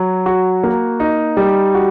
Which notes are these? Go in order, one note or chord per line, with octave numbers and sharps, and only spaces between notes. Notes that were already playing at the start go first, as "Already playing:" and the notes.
Already playing: F#3
F#4
A#3
D#4
G3
F#4